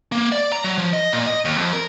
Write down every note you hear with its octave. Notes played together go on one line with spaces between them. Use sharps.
A#3
D5
A#5
F#3
F3
D#5
A#2
D#5
D#2
F2
A#4